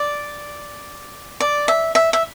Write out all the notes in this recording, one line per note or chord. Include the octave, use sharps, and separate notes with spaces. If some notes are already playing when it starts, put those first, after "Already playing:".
Already playing: D5
D5
E5
E5
E5